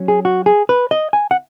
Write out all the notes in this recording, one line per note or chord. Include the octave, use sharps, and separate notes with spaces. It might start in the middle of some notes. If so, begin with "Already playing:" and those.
Already playing: F#3 C#4
G#4
F#4
G#4
B4
D#5
G#5
F#5